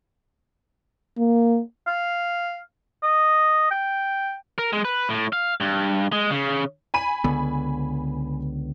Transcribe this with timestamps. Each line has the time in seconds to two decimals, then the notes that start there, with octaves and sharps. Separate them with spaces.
1.18 A#3
1.87 F5
3.03 D#5
3.71 G5
4.58 A#4
4.73 G#3
4.85 B4
5.09 A2
5.33 F5
5.60 G2
6.12 G#3
6.31 C#3
6.94 G#5 B5 D#7
7.24 C#2 D3 B3